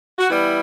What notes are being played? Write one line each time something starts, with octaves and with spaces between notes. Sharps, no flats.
F#4
E3 G3 B3 E4